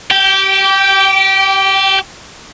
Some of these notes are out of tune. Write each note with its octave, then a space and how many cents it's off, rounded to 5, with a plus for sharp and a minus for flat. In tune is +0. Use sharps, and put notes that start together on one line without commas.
G4 -25 G5 +0